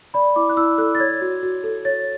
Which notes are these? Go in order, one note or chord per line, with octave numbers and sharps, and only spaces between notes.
D5 B5
E4 D6
F#6
E4 E6
A4 F#6
A6
C#5 G#6
F#4
F#4
A4
C#5 A6